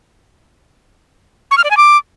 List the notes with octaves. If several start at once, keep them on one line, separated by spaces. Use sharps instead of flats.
C#6
F6
D5
G#5
D6